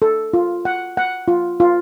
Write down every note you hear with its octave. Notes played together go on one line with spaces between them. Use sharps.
A4
F4
F#5
F#5
F4
F4